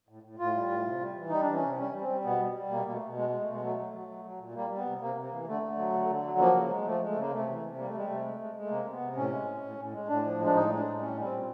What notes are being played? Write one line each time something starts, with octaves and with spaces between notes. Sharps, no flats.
A2
A2
A2 F4
G3
A2
C3
G3
E3
G3 D#4
D4
E3
C#4
C3
G3 C#4
G3
C4
G3
B2 B3
G3
G3
B2 A#3
B2 A#3
A3
B2
G#3
G#3
A3
B2
G#3
F#3 A3
F#3
F#3
F#3
F#3
A#2
G3 A#3
G3
B3
C3
C3 A#3
C3
A#3
E3
D3 A3
D3
F#3
D3
D3
F#3
F3 A#3
C#3
G#3
F3 A3
G#3
A3
C#3 A#3
C3 A3
E3
C3
G3 A#3
A3
G3 G#3
C3 A3
G#3
G#3
G#3
A3
C3 A#3
C3
B3
C3
A2 C#4
G#3
A2
A2
A2
G#3
A2 D4
F3
G#3
D4
A2 D#4
G#3
D4
A2
G3 C#4
G3
C4
A#2